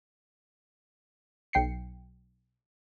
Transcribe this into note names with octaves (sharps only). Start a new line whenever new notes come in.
B1 G5 C7 C#7